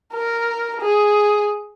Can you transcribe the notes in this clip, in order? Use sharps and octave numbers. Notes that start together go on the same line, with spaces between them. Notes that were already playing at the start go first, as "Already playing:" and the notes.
A#4
G#4